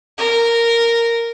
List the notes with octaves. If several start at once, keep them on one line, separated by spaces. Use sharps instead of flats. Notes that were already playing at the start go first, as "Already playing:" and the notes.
A#4